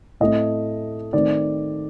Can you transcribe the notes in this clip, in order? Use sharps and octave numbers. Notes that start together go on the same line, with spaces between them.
A2 A3 C4 D#5
D#3 A3 C4 D5